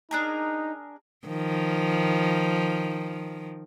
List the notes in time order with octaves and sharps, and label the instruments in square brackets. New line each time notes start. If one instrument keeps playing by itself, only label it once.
[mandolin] D4 G#4 A#4 [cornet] D#4
[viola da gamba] D#3 F3